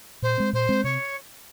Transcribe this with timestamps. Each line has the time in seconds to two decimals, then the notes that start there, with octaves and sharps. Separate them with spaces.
0.22 A#2 C5
0.38 G#3 C4
0.53 A#2 C5
0.69 G#3 C4
0.84 C3 C#5